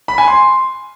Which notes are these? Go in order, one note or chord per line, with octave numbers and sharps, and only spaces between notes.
B5
G#5
C6